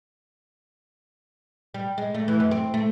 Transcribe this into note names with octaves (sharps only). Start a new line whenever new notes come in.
G3
G#3
A3
E3
F#2
C4
A3